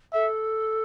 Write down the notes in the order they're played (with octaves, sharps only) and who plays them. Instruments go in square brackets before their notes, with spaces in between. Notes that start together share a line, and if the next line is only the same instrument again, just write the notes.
[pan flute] A4 [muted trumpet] E5